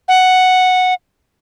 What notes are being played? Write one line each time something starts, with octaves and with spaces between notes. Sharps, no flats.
F#5